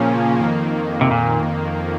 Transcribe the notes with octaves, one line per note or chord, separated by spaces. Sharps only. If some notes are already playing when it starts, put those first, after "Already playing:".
Already playing: A#2 C#3 F3 A#3 C#4
F2 D#3 A#3
C3
A#2